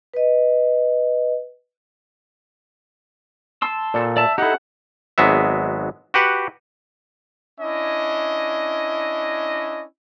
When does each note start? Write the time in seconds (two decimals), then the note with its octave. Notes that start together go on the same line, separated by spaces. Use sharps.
0.14 B4 D#5
3.62 A5 C6 E6
3.94 A#2 A4
4.17 D5 E5 A5
4.38 D#4 E4 G4 A4 F#5
5.18 G#1 F#3 G#3 B3 E5
6.14 F#4 G4 B4 F#5
7.60 C#4 D4 E4 D#5